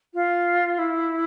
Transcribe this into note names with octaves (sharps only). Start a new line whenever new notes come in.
F4
E4